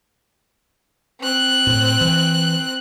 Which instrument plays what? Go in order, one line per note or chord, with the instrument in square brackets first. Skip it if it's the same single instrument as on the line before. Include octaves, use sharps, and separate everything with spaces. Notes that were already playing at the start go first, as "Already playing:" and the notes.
[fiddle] C4 F#6
[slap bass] A2
E3